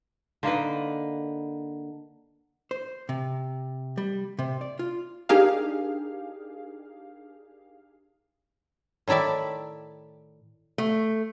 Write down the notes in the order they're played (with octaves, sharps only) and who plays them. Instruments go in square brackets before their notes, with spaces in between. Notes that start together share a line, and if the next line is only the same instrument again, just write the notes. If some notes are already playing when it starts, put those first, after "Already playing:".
[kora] D3 A#3 D#4 B4
[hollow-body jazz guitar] C5
C3
G3
C3
D5
F4
[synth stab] D4 D#4 G4 G#4 A#4 F5
[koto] A2 D#3 E4 D5 E5
[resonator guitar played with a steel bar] A3